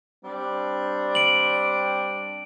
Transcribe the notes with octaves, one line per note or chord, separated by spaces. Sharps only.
G3 C4 D4
D7 F#7